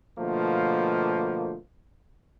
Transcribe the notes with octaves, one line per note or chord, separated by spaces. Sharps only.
B2 D3 F3 A3 A#3